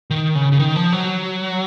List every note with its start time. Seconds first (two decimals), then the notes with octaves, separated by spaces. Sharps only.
0.10 D#3
0.35 C#3
0.52 C#3
0.59 D#3
0.76 F3
0.93 F#3